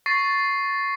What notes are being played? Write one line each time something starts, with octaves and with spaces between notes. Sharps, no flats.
C#6 A6 A#6 C7